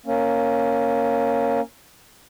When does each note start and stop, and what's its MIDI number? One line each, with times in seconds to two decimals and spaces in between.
0.06 1.61 58
0.06 1.61 61